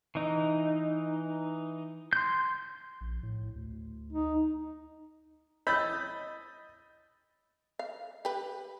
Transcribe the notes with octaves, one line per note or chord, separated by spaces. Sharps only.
E3 D#4
C6 G6
A#1
A2
D2
D#4
C#5 D#5 B5 E6 G6 A6
F5
G4 B4